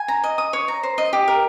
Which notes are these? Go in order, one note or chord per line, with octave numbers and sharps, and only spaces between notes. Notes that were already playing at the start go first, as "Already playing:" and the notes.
Already playing: G#5
A#5
D#5
D#6
C#5
A#5
C5
D#5
G4
A#4